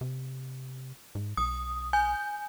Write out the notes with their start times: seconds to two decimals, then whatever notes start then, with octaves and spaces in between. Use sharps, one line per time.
0.01 C3
1.15 G#2
1.37 B1 D#6
1.93 G#5 G6